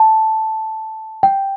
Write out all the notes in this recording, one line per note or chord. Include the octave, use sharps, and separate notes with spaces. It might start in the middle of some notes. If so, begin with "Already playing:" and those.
Already playing: A5
G5